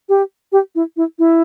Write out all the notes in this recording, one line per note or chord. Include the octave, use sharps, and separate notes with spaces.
G4
G4
E4
E4
E4